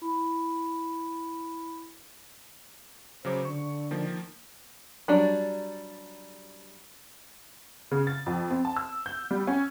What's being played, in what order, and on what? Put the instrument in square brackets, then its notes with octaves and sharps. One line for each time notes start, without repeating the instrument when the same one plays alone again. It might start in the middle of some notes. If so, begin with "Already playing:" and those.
[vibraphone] E4 B5
[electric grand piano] C#3 F#3 D6 [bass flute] C5
[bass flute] D3 [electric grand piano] C#6
[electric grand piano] D#3 F3 A#3
[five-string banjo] F#3 G3 D4
[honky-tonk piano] C#3
A6
F2
C4
A5
E6
G6
G3
C#4